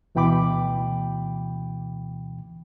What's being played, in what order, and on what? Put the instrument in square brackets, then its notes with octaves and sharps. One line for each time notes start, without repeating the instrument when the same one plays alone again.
[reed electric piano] D2 B2 E3 G5 B5 D6